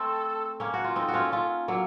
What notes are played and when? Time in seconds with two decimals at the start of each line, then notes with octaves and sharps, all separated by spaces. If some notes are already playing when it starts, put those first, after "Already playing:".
Already playing: A3 C4 A4
0.60 A#3 C#4
0.74 F#4
0.84 F4
0.96 C4 D#4 A4
1.08 F#4
1.14 C#4 F4
1.32 C#4 F4
1.68 F#3 A#3 A4